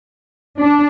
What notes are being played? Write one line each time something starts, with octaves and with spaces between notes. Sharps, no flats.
D4